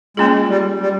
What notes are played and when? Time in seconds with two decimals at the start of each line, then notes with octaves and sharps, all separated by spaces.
0.17 G#3 A#3 C#4 F4 G#4
0.48 G3
0.80 G3